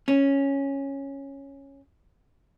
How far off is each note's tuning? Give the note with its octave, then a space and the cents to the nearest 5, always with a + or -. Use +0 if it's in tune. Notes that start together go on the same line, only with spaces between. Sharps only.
C#4 -5